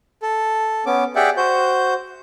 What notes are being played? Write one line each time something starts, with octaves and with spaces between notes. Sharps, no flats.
A4
B3 C#4 D6
G4 G#4 D5 E5 F#5 G5
F#4 C5 G6